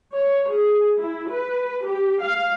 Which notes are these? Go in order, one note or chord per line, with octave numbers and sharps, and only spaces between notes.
C#5
G#4
E4
B4
G4
F5